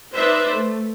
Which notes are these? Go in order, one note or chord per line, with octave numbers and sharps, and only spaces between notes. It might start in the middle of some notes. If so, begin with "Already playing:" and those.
D#4 B4 C5 D5 E5
A3